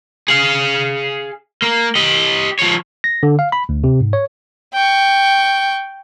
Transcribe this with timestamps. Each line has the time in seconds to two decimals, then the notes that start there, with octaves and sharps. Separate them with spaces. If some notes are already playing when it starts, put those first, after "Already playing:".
0.28 G#4 F5
1.62 A#3
1.95 G4 D#5
2.59 F3 C#5
3.04 A#6
3.23 D3
3.39 F5
3.52 B5
3.69 D2
3.84 C3
4.01 G#2
4.13 C#5
4.73 G5 C#6